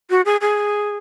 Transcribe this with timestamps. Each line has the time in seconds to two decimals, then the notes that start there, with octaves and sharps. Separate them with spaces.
0.10 F#4
0.25 G#4
0.41 G#4